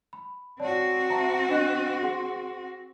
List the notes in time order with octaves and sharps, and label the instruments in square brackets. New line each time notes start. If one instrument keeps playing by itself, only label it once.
[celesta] B5
[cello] C4 F#4 [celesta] C#5 D5 A5
[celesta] E5 A5 A#5
D4 D#5 F#6
G#4 F#5 C6